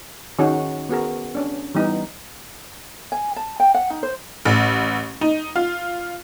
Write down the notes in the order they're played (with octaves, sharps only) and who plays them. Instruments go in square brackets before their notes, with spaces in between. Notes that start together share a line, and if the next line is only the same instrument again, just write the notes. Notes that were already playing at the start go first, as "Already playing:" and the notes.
[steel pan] D#3 C#4 D#4 F#4 G#4
B3 F#4 G#4 A#4
C#4 D4
E3 G3 B3 D#4
[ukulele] G#5
A5
G5
F#5
D#4
C5
[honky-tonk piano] A1
D#4
F4